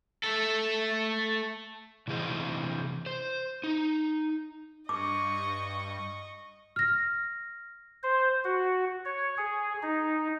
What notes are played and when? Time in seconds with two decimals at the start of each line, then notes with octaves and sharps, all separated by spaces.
0.23 A3 A4
2.07 C3 E3 G#4 C5 D#5
3.06 C5
3.63 D#4
4.89 G2 D#5 C#6 D6
6.76 F6 A#6
8.03 C5
8.44 F#4
9.05 C#5
9.38 G#4
9.83 D#4